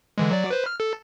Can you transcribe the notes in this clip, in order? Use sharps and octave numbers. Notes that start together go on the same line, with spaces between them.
D3 E3 G#3
F#3 D5
B4 C5
F6
A4